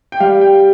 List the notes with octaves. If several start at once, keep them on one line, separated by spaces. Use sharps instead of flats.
G5
G3 F5
G5